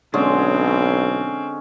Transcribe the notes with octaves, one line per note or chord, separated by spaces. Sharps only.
B1 D3 G#3 C4 C#4